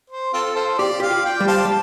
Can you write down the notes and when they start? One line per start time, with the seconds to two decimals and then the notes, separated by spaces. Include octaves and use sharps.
0.10 C5
0.33 C4 F4 A4
0.56 F4 A4 C5
0.78 G4 D5
1.00 G4 F5
1.10 F4
1.25 D5 G5
1.40 G3
1.48 C5 F5 A5
1.65 G3